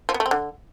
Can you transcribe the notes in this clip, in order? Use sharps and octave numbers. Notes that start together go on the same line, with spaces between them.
F3
B3
A3
C4
D3